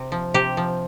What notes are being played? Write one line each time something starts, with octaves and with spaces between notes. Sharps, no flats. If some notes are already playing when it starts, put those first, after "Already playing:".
Already playing: C3
F3
C3 G4
F3